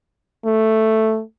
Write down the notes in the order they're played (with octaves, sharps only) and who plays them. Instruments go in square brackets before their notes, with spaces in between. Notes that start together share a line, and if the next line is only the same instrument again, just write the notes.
[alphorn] A3